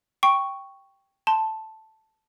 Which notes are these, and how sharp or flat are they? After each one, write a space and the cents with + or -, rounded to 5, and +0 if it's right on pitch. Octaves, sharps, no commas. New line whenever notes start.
G5 +0 C#6 +0
A5 +0 C6 +0